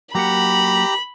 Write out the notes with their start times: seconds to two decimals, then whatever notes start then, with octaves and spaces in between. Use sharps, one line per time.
0.15 F#3 A#3 G4 F#5 A#5 B5